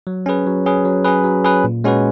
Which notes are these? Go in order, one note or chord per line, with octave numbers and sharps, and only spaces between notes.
F#3
C#4 G#4 B4
F#3
C#4 G#4 B4
F#3
C#4 G#4 B4
F#3
C#4 G#4 B4
A#2
G#3 C#4 F#4 B4